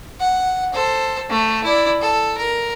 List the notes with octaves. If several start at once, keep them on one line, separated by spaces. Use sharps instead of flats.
F#5
A4 C5
A3
E4 D5
A4
A#4